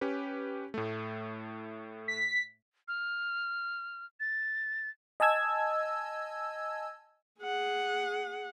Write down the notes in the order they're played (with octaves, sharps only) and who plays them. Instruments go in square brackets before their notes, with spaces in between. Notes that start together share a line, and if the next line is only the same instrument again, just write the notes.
[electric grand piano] C#4 G4 B4
A2 A3
[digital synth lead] B6
[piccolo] F6
A6
[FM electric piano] D#5 G#5 A5 E6 G#6
[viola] G#4 F#5